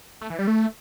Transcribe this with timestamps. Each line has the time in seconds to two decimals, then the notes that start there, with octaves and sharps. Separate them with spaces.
0.21 A3
0.30 E3
0.39 G3
0.47 A3